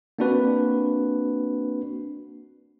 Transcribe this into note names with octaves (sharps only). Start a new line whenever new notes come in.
A#3 C4 D4 F#4 B4